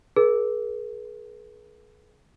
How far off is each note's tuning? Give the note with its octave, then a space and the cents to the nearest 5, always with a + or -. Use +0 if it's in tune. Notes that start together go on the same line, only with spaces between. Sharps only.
G#4 +30 B4 -45